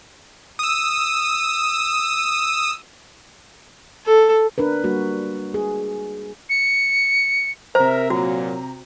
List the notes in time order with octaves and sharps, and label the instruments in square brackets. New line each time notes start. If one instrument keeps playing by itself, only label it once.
[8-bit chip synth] D#6 E6
[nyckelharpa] A4
[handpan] D4 A#4 B4
G3 A#3 F#4
G#4
[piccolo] C#7
[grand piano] C3 A#5 [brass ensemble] A#4 E5 [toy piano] C5
[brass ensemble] A#2 F#3 [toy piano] F#4